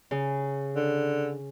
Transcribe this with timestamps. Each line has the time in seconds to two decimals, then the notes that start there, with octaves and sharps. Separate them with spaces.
0.11 C#3
0.76 D3